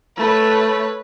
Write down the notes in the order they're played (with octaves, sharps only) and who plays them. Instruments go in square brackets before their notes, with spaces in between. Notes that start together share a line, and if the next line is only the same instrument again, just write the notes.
[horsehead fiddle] A3 [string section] B4 C#5